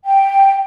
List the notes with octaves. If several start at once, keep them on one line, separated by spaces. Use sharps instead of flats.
G5